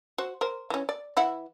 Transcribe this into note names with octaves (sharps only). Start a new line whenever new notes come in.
F#4 C5
A#4 C5
E3 C#4
D5
E3 E4 F#5